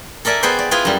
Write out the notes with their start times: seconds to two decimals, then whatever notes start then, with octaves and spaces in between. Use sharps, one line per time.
0.25 A4 A#4 D5 E5 G#5
0.43 B3 G#4 B4 C5 D5 G5
0.59 D5
0.71 B3 E4 F4 G#4 B4 G#5
0.85 F#2 G3